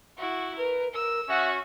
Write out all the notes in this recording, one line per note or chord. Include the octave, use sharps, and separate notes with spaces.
E4 F#4
A#4 B4
A#4 E6
C#4 F#4 E5